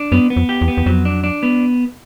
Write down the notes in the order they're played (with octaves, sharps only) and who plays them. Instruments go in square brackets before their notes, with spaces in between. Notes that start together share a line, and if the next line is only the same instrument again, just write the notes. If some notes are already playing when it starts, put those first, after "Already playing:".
Already playing: [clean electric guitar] D4
[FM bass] F#2 [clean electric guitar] B3
[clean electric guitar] B3
[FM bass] F2
[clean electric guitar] G4
[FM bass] E2
[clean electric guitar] B3
[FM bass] E2
[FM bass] F2 [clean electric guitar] F#3
[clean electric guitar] D4
D4
B3